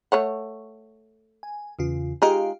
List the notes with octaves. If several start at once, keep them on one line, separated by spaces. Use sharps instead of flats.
A3 C#5 F#5
G#5
E2 C#3 F4
G#3 D#4 F4 G4 F5